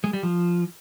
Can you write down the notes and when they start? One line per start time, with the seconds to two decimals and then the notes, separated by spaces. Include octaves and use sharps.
0.04 G#3
0.13 G3
0.23 F3